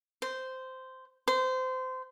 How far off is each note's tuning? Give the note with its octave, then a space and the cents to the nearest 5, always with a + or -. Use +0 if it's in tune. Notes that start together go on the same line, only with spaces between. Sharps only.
C5 -10
C5 -25